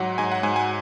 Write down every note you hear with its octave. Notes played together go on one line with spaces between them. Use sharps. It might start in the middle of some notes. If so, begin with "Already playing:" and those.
Already playing: G#2 F#3 F#5
G#2 G#5
F#5
G#2 G#5
G#5